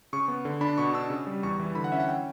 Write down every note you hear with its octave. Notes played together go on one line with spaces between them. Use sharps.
C#3 C#6
B3
D3
D4 B5
B2 C#6
D4 E6
C#3
G3
E2 C#6
E3
D3 B5
F#5
C#4 E5
F#5
G5